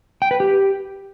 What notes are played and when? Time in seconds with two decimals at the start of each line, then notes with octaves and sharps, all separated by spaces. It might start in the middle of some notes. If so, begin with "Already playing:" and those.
0.22 G5
0.31 B4
0.40 G4